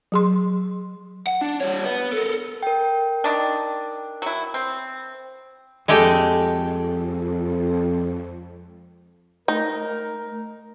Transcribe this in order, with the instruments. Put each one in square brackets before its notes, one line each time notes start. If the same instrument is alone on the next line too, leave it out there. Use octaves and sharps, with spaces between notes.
[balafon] F#3 G#4 C6
[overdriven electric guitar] F#5
D4
G3 C#5
B3
A4 A#4
[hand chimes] A#4 G5
[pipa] D#3 D4
F#3 E4
C4
[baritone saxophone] F2 [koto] G#3 A3 G4
[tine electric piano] A3 [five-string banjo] D#4 [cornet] A#4